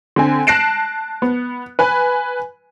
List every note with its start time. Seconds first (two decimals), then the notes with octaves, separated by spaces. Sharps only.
0.16 D3 C4 G#5
0.47 A5 F#6 A#6 C7 D7 E7
1.22 B3
1.79 B4 G#5